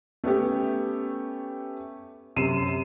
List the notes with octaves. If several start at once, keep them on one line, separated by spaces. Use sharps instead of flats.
A3 B3 C#4 G4
F#2 C3 C7 D#7 E7